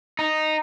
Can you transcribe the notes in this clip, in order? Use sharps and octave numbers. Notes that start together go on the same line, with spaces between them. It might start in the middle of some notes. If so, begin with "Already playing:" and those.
D#4